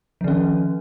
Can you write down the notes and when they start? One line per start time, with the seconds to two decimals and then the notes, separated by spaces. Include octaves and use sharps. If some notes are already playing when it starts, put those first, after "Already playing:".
0.21 F3
0.24 D#3
0.28 C#4